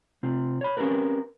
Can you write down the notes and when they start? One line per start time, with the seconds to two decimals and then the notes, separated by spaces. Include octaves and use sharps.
0.23 C3 C4 F4
0.61 C#5 B5
0.77 C4 C#4 F4 G4 A#4 B4